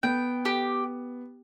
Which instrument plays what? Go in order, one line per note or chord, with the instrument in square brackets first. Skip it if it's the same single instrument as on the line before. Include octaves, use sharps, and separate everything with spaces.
[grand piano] B3 [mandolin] G5
[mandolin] G4